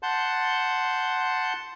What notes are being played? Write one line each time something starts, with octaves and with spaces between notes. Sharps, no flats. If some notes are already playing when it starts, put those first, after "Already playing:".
F#5 A5 C6 G6